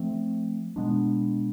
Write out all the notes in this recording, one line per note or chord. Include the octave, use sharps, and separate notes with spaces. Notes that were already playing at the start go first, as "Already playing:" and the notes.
Already playing: F3 A3 C4
B2 G#3 B3 D4